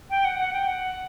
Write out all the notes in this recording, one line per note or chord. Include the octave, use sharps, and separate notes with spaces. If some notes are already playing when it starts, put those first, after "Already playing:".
G5
F#5
F#5
G5
F#5